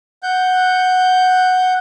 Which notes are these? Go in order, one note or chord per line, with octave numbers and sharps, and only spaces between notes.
F#5 G6